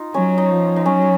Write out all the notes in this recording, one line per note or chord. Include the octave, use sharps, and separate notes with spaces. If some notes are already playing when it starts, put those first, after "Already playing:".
Already playing: D#4 F4
F#3 C#4
D#4
F3
D#4
F#3 C#4